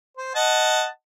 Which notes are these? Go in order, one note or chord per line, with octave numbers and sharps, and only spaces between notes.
C5
D#5 F#5 A5